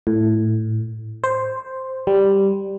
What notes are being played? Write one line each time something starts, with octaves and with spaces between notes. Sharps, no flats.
A2
C5
G3